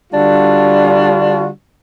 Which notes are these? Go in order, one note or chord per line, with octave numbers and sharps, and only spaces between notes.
D3 G3 D4 F4 F#4